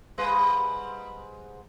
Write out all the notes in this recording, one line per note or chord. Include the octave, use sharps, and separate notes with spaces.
G#2 G3 B4